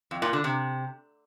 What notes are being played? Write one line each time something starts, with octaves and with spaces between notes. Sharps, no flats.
F2
A#2
D3
C3